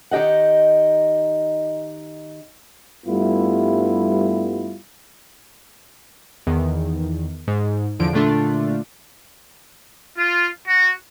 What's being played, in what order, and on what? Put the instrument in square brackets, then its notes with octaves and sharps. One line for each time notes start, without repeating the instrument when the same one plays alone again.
[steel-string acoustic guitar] D#3 D#4 G4 D#5 F#5
[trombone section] G2 G3 A3 B3 E4 F4
[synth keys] E2 D#3
G#2
E2 D3 F3 D7
A#2 D3 A3 D4 F4
[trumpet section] F4
F#4